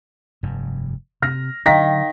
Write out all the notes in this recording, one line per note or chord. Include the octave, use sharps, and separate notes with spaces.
F1 G2
C3 F6 A#6
D3 D#3 F#3 D4 F5 A#6 B6